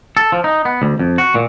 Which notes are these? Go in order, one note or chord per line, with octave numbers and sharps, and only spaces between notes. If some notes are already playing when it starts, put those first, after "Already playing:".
A4
F3
D#4
B3
D2
F2
F#4
A#2